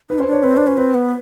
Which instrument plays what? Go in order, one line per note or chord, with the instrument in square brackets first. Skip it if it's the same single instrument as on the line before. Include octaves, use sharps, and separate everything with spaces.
[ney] D#4 [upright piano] B4
[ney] C#4 [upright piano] C5
[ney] D4
[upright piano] C#5
[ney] C4 [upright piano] B4
[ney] D4 [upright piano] C5
[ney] C#4 [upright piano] B4
[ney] C4 [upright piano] B4
[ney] B3